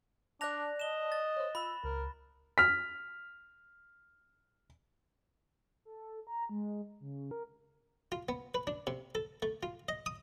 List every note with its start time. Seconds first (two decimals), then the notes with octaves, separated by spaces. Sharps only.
0.41 D4 D5 A5 F#6 A#6 F7
0.80 D#5 E7 G7
1.12 A6
1.36 C5 C#5
1.55 F4 B5 E6
1.84 C#2 A#4
2.58 F6 B6
5.85 A4
6.27 A#5
6.49 G#3
7.00 C#3
7.31 A#4
8.12 F4
8.29 B3
8.55 B4
8.67 D4
8.87 C3
9.15 A4
9.42 A3
9.63 F4
9.89 D#5
10.06 D#6